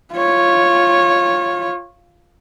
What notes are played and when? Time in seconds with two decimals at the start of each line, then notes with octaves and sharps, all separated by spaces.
0.14 F4 C#5